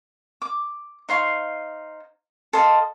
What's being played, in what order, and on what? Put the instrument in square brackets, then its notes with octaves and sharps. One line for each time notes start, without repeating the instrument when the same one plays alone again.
[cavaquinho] D6
D#4 C5 F5 C#6
A4 C5 D#5 F5